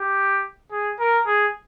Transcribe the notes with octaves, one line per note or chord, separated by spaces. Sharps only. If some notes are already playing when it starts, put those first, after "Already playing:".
Already playing: G4
G#4
A#4
G#4